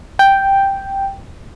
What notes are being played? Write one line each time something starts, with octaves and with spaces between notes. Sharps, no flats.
G5